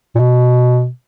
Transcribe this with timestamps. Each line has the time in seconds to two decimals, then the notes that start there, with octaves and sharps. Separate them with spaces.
0.15 A#2
0.20 B2